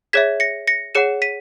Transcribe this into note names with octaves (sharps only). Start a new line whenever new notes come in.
G#4 C#5 E5 G#6 B6
A#6 C#7
A#6 C#7
G#4 C#5 F#5 C#7 E7
B6 D#7